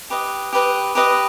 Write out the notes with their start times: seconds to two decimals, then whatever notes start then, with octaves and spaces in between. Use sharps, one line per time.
0.10 G4 B4 D#5
0.53 G4 B4 D#5
0.95 G4 B4 D#5